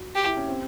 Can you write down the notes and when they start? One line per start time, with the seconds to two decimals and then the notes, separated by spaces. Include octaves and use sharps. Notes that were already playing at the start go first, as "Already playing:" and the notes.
Already playing: F#4
0.15 G4
0.26 E4
0.37 C#4
0.48 C4